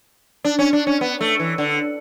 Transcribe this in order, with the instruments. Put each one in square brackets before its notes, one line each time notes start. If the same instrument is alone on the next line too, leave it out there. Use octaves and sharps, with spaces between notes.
[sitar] D4
C#4
D4
C#4
B3
A3
E3
D3